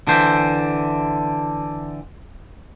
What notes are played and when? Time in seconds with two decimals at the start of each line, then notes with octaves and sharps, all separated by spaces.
0.07 D3 E3 C5